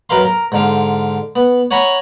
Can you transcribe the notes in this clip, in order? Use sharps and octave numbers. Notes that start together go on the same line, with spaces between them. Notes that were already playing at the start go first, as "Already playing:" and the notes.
F#2 A#4 B4 F5 C6
A#4
G#2 D3 F5
B3
C#5 F#5 G#5 A#5 B5